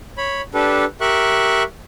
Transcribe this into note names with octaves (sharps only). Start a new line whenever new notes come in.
C#5 B5
D4 G4 A4 B4
G4 A#4 E5 C#6 F#6